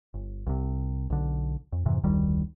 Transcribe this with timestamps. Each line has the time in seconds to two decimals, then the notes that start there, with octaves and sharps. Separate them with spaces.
0.14 G1
0.47 C2 C3
1.10 B1 D3
1.72 F2
1.85 F2 G#2 C3 E3
2.03 F1 D2 D#3 G3